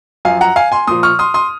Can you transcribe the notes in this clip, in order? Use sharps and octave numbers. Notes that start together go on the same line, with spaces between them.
F#2 F3 F5 G#5
F#5 A#5
F5 G#5
G#5 C6
A#2 F3 C6 D#6
C#6 F6
C6 D#6
C6 D#6